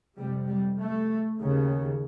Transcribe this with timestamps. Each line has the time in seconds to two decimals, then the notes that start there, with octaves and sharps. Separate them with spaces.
0.17 F2 C3 G3
0.48 G3
0.78 A3
1.40 D#2 C#3